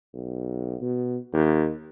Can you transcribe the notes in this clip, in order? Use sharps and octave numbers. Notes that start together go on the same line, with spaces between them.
B1
B2
D#2